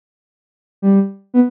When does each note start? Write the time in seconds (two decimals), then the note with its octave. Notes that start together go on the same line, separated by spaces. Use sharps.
0.82 G3
1.34 B3